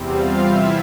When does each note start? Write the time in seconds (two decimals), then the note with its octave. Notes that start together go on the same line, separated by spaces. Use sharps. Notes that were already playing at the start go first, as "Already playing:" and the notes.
Already playing: E2 C3 G3 C4
0.13 F4 F5
0.44 E4 E5